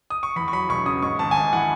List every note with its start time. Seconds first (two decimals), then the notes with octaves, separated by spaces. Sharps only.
0.10 D#6
0.23 C#6
0.36 E2 B5
0.48 C#6
0.53 F#3 B5
0.69 E1 C#6
0.86 C#3 D#6
1.02 G#2 C#6
1.19 G#1 A5
1.31 G#5
1.36 G#1 A5
1.53 E3 F#5